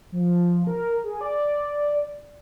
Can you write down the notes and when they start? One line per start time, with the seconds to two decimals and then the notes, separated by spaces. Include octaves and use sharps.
0.12 F3
0.67 A#4
1.04 G#4
1.21 D5